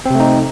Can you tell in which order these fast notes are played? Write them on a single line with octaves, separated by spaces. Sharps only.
C4 C3 A3 D#4